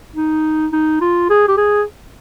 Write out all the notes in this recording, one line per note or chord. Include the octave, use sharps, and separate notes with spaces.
D#4
D#4
F4
G#4
G4
G#4